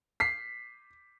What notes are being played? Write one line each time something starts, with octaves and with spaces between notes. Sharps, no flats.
B6 C7